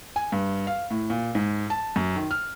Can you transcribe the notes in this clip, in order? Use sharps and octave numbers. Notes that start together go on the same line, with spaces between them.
G#5
G2
F5
A2
A#2
G#2
A5
F#2
D#3
F6